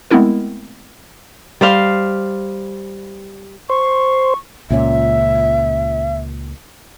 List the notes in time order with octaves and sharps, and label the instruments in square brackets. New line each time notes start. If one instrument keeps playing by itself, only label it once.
[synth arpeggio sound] G#3 A3 B3 C4 E4 A#4
[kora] G3 C5 F5
[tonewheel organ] C5 [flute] C#6
[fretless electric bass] C#2 A#2 C#4 [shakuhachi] E5